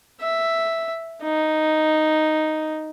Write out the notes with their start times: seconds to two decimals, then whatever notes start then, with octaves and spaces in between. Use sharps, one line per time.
0.21 E5
1.23 D#4